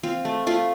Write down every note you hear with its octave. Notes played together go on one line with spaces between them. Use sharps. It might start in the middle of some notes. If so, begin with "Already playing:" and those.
C4 F4
A3
A3 F4